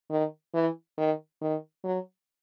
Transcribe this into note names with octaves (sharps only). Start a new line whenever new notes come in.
D#3
E3
D#3
D#3
F#3